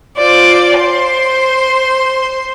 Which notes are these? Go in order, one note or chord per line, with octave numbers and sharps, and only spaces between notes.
F4 C5 D5
C5 C6